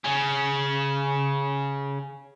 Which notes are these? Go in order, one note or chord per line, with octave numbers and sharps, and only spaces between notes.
C#3 C#4